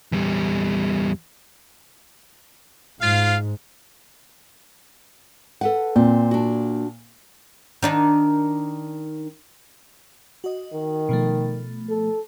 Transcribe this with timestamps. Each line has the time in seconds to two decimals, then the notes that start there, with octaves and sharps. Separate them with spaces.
0.12 E2 G3
3.01 G#2 F4 F5
5.61 A4 B4 F#5
5.96 A#2 C4
6.31 D4 F#4
7.83 D#3 D4 D#4
10.44 F#4 D#5
10.74 D#3
11.09 B2 F3 A3
11.90 A4